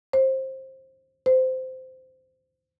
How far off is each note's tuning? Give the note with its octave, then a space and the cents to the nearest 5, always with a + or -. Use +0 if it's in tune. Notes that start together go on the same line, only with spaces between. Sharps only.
C5 +20
C5 -15